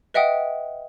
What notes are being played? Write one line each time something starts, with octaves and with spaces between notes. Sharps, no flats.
B4 D#5 E5 F#5 G5 D#6